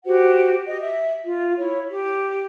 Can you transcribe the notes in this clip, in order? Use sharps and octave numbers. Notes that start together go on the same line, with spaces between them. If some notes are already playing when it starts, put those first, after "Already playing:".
F#4 G4 C5 F#5
G4 D#5
E5
F4
E4 C#5
G4